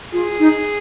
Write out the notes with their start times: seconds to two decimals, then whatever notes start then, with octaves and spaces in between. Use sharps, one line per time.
0.13 F4 G#4
0.39 D#4